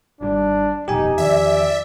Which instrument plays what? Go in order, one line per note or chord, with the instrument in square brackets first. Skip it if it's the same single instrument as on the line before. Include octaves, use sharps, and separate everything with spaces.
[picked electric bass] G#1 D#3 G3 [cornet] D4
[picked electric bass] D#1 F2 B2 [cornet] D#4 [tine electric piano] G4 G#5
[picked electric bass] E2 D#3 F3 [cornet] D5 [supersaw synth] E5